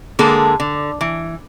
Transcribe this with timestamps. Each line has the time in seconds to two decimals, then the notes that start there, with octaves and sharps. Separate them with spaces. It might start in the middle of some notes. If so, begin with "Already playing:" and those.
0.19 D3 G#3 A#3 G#4 A4
0.60 D3
1.01 E3